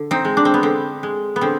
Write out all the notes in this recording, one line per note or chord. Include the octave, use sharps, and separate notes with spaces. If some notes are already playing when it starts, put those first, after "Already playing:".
Already playing: D3
C4 D#4
G#3
D4
C4
B3
D3 C4
G#3
B3
D3 C4